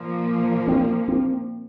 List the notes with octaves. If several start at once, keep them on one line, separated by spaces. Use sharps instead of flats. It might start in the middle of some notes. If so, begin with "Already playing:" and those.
Already playing: A#2 F3 A#3
C4
C4